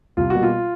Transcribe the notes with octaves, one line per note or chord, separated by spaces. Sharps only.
C2 F4
B2 G3 A#3 F#4
F4